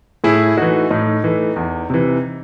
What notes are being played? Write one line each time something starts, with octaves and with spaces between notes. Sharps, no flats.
A2 E4 G#4
E3 A3 D#4 F#4
A2 D#4
E3 A3
E2
C3 E3